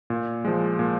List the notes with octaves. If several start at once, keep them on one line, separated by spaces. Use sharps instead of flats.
A#2
F3 G#3
A#2